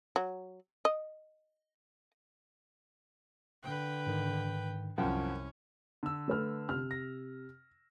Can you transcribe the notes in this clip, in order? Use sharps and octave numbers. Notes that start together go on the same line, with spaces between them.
F#3
D#5
D3 B4 G5
G#2 D#3
C2 F#2 F3 C#4 F#5 G5
D3 E6
A3 B4 F6
C3 F6
A#6